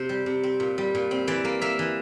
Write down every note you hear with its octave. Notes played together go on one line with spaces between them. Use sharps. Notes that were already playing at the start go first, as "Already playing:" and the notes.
Already playing: C3 C5
G3
C3
C4
A#2
G3
A#2
C4
E3 D5
A#3
A#3 E5
E3